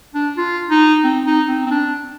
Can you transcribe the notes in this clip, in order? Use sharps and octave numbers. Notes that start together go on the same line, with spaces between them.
D4
F4
D#4
C4
D#4
C4
C4
D4